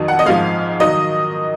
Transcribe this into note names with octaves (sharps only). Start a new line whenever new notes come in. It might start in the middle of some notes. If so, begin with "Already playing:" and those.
Already playing: F2 D#3 F#3
F#5
D#5
G#2 F3 G#3 F5
D#3 F#3 D#5